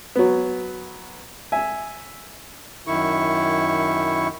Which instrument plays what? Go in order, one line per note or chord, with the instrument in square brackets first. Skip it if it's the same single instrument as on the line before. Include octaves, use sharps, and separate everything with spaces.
[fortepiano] F#3 B3
E5 G#5
[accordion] F#2 D#3 E4 C#6